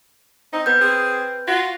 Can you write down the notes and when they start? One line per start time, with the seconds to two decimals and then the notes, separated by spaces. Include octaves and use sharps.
0.53 C4 D#4
0.66 B3 B4 G6
0.81 C4 G#4
1.48 F4 F#4 A#6